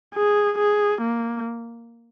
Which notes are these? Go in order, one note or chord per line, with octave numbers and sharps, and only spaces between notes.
G#4
G#4
A#3